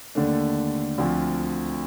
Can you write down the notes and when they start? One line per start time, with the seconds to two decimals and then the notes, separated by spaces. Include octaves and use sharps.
0.15 D#2 D3 A3 D4
0.98 D2 D3 F3 C4